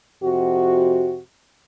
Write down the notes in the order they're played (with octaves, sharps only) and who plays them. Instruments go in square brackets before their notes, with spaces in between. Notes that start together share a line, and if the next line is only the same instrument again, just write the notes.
[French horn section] F2 C3 F#4